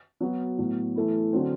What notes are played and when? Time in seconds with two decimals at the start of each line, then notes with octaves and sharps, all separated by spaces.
0.20 F#3 B3 F#4
0.58 A2 F#3 B3
0.96 E3 A3 E4
1.33 D3 F#3 C4